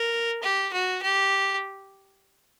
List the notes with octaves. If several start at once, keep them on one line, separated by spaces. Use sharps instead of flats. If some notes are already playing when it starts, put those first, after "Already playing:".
Already playing: A#4
G4
F#4
G4